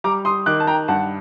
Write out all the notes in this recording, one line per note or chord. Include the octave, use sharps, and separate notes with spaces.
G3 A#5 D6
C6 D#6
D#3 D6 F#6
A5
G5 A#5
G2 F#5 A5